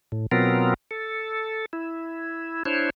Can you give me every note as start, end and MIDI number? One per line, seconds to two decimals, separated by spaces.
0.12 0.26 45
0.31 0.74 47
0.31 0.74 54
0.31 0.74 59
0.31 0.74 60
0.31 0.74 65
0.31 0.74 70
0.91 1.66 69
1.73 2.63 64
2.65 2.90 62
2.65 2.90 64
2.65 2.90 72
2.65 2.90 73